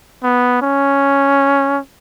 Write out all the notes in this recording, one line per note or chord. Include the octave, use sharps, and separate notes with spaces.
B3
C#4